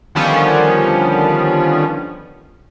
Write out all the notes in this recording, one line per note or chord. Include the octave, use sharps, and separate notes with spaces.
D3 D#3 F3 G3 B3 C#4